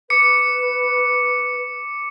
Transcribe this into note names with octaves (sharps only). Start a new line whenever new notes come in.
B4 D6 C#7